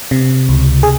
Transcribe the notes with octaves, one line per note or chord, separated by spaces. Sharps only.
C3
C#2
G#4